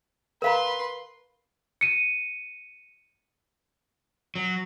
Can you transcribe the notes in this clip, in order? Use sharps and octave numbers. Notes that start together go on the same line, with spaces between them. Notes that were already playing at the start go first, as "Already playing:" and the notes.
A#4 B4 F5 A#5 C6
C#7 D#7
F#3